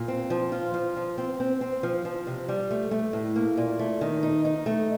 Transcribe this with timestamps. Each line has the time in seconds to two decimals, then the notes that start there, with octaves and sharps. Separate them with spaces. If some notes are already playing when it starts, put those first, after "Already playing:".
Already playing: A#2
0.08 C4
0.30 F3
0.52 F4
0.74 F3
0.96 F3
1.18 C4
1.40 C4
1.61 C4
1.83 F3
2.05 F3
2.27 C3
2.48 G3
2.71 A3
2.91 A3
3.13 A2
3.36 A#3
3.57 A#2
3.79 A3
4.01 D#3
4.23 D#4
4.45 D#4
4.66 A3